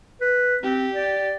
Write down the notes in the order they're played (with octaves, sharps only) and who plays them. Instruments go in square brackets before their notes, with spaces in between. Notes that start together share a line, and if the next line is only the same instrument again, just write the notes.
[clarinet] B4
[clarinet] C4 [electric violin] G4
[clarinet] D5